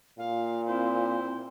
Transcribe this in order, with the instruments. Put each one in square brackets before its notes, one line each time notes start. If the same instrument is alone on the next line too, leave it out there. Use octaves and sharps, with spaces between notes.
[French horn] A#2 [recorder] F5
[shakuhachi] C4 [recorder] E4 [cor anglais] C5